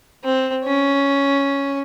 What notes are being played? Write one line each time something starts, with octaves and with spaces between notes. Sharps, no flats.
C4
C#4